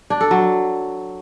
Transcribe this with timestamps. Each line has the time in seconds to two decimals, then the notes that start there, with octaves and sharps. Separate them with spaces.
0.10 D4
0.21 A4
0.31 F#3